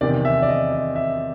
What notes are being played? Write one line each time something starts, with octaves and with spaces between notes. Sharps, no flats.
E2 C3 D#3 D5
E5
D5
D#5
D#5
E5